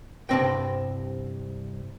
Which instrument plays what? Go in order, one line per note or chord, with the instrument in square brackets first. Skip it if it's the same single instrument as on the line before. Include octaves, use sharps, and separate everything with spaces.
[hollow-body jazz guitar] C2 G2 G#3 C4 D#5 G5